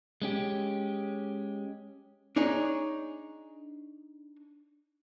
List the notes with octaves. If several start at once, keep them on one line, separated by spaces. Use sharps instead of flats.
G#3 C#4 G4
D4 D#4 G#4 C#5